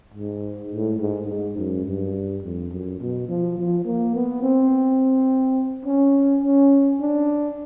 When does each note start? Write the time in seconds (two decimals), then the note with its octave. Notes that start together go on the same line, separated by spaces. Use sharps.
0.14 G#2
0.71 A2
1.00 G#2
1.28 G#2
1.57 F#2
1.86 G2
2.43 F2
2.71 F#2
3.00 B2
3.28 F3
3.58 F3
3.85 A#3
4.15 B3
4.42 C4
5.85 C#4
6.43 C#4
7.00 D4